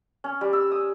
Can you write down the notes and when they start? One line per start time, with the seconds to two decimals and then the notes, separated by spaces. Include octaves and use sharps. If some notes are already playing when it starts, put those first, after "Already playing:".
0.24 C#4
0.41 G3
0.53 E6
0.72 D#6